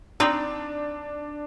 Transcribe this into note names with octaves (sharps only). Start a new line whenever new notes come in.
C4 D4 D#4 B4